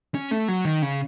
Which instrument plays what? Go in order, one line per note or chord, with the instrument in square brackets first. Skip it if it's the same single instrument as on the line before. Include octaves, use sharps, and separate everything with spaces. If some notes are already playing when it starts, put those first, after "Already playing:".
[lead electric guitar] C#4
A3
F#3
D#3
C#3